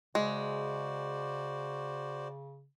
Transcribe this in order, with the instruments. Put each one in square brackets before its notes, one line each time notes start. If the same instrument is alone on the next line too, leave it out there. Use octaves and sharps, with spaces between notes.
[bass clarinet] C#3 [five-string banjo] G#3 [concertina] F#4 C5 D5